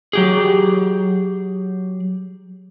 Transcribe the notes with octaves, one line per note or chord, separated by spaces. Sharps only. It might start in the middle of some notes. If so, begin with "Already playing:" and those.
F#3 G4 G#4